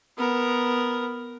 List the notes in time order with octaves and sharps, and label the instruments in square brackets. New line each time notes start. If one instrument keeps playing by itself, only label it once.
[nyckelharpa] B3 A#4